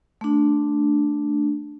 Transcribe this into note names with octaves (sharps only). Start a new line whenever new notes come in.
A3 D4